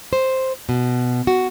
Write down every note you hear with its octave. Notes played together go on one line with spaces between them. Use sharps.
C5
B2
F#4